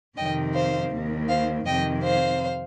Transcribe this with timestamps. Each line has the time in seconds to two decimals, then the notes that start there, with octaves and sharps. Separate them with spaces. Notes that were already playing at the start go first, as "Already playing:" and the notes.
0.17 F2 C3 D#3 D#5 G5
0.54 C5 F5
0.92 D#2 D#3
1.28 C5 F5
1.66 F2 C3 D#3 D#5 G5
2.03 C5 F5